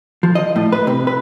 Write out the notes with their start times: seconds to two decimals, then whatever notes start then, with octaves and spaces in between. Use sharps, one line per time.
0.23 F3
0.35 D#5
0.56 A2
0.72 B4
0.87 C3
1.07 B4